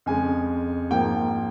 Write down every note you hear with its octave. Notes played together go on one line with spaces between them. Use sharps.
F2 C#3 G#3 G#5
G#2 F3 A#3 G5